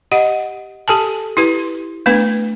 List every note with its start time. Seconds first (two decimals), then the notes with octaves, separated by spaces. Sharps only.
0.12 G4 D#5 F#5
0.88 G4 A4 G#5 A5
1.37 E4 G4 B4
2.06 A3 B3 D4 B4